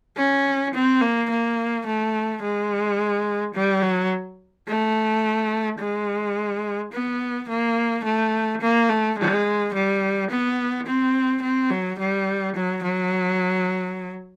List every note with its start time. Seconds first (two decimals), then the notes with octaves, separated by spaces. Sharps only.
0.17 C#4
0.74 C4
1.01 A#3
1.30 A#3
1.86 A3
2.42 G#3
3.54 G3
3.82 F#3
4.67 A3
5.80 G#3
6.92 B3
7.49 A#3
8.04 A3
8.61 A#3
8.89 A3
9.18 G#3
9.74 G3
10.30 B3
10.86 C4
11.42 C4
11.70 F#3
11.99 G3
12.56 F#3
12.83 F#3